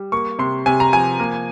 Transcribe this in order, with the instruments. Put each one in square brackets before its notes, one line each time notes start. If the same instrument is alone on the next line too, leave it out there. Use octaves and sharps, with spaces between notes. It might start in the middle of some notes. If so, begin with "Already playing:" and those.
Already playing: [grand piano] G3
A#3 C#6
C3 C6
C3 G#5
A#5
F3 G#5
A#3